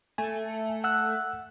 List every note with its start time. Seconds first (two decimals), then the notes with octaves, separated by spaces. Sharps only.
0.18 A3 G#5
0.84 F#5 E6 F#6